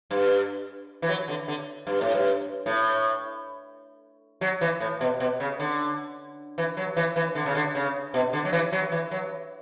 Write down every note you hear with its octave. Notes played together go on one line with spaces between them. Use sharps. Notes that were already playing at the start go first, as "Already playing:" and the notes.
G2
E3
F#3
D3
D3
G2
A2
G2
A2
F#3
E3
A2
B2
B2
C#3
D3
E3
F#3
E3
E3
D3
C#3
D3
C#3
B2
D3
F#3
E3
F#3
E3
F#3